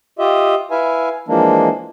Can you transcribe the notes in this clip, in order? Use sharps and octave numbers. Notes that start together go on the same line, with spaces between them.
F4 G4 D#5 E5
E4 B4 E5 F5 G#5
E3 F3 G#3 A#3 D4